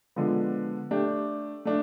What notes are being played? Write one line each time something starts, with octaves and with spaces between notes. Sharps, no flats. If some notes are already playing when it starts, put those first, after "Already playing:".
D3 F3 G#3 B3
A3 D4 G4
A3 D4